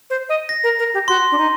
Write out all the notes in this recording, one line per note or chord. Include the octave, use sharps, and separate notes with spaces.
C5
D#5
A#6
A#4
A#4
G4
F#4 C6
D4
D#4